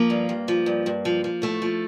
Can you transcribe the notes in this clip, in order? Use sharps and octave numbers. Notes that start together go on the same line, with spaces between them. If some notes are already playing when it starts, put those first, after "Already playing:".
Already playing: F3 A#3
G2
G2
F3
G2
G2
F3
F3
A2 A3
F3